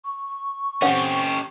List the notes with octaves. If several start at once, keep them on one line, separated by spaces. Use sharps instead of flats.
C#6
C4 C#4 G4 F#5